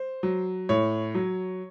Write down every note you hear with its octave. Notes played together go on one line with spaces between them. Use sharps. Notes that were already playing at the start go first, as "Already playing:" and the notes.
Already playing: C5
F#3
A2 C#5
F#3